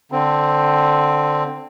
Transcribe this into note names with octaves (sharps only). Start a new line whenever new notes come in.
D3 C4